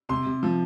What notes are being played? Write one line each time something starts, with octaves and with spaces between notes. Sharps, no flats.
C3 C6
C3
F3